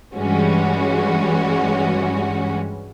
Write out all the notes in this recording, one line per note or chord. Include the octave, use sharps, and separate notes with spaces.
G2 E3 G3 G#3 C#4 F#4